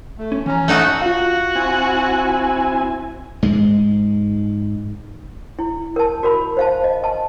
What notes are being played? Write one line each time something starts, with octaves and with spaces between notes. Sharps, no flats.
A3
C#4
E3 C#4 A#5
A3 D#4 F#4 E5
F4 F#4 F5
C4 E4 G#5
G#2 G#3
E4
A#4 A5
F#4 A#4 B5
C5 F5 A5
D#5
A5